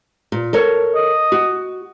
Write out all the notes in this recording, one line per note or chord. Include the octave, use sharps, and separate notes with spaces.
A#2
A4 A#4 C#5
D#5
F#4